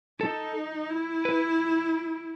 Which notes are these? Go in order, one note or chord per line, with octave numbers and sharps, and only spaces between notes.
D#4 A4
E4
B4